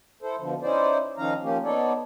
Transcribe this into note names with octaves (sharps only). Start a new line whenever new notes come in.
E4 A4 C5
B2 D3 F3
C#4 D#4 E4 C5 D5
D#3 F3 C#4 D#4 F5 A#5
F3 A#3 C#4 G4
B3 D#4 A4 C#5 D5